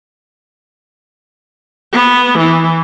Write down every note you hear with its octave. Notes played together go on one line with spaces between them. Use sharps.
B3
E3